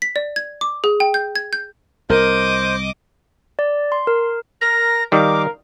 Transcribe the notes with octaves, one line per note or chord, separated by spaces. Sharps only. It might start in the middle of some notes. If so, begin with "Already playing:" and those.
B6
D5
G#6
D6
G#4
G5
G6
G#6
G6
C2 A#4 C5 D#5 D6
D5
C6
A#4
A#4 A#6
D#3 G3 A#4 F5 D6